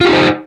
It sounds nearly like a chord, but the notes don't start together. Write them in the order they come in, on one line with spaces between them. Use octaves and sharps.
F4 G4 D#4 C5